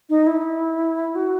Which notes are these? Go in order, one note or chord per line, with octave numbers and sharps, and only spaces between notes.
D#4
E4
F#4